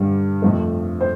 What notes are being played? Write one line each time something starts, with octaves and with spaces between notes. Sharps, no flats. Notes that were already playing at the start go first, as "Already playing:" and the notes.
Already playing: G2 D3 G3
F2 F3 A3
C5